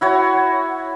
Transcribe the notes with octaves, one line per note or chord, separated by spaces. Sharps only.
E4 F#4 C#5